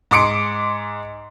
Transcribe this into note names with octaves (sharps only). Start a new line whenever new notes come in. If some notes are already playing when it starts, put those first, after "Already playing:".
G#2 C6 D6 C#7 D7